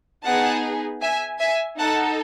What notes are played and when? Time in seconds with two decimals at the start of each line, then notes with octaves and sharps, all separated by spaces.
0.25 B3 D#4 G#4 F#5 A5
1.02 E5 G#5
1.40 E5 G#5
1.78 D#4 A4 F#5 A5